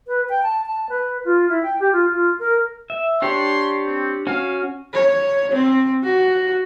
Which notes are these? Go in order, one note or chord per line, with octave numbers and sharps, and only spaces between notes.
B4
G5
A5
A5
B4
F4
E4
G5
G4
F4
F4
A#4
E5
D4 G4 C#5 C6
C4
C#4 F#4 F5
C#5
C4
F#4